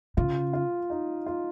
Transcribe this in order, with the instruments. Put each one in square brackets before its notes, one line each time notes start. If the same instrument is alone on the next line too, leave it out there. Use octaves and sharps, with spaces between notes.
[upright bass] C#3 [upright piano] F4
[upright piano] F4
D#4
F4